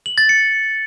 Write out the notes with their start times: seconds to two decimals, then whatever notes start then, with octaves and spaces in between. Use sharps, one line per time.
0.06 F#7
0.18 A6
0.29 C#7